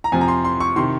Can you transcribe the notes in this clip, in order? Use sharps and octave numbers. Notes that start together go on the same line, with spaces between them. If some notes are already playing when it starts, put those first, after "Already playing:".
A#5
F2 C3 F3 G#5
A#5
C6
C6
C#6
C3 D#3 C6